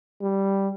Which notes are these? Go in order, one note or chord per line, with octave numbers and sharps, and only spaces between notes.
G3